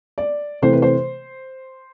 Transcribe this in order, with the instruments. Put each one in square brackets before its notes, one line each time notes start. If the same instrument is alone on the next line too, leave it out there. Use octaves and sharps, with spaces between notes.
[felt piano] D5
C3 E3 A3 C5
B4
C5